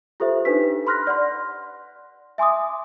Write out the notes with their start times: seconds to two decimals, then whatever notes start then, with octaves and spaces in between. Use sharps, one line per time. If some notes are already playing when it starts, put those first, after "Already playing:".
0.20 F4 G4 A4 C5 E5
0.45 D4 D#4 G4 B4 B6
0.87 B5 C6 F6 F#6 A#6
1.07 D5 F#5 C6
2.38 E5 G#5 C6 D6 D#6